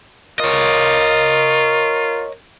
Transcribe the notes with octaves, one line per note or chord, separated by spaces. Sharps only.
F4 A#4 C#5 D#5